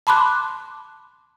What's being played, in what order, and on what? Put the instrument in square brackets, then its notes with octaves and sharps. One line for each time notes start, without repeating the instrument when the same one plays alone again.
[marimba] A5 B5 C6 D6 F#6